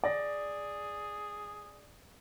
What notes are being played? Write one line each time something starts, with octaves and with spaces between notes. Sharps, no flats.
G#4 D5 A#6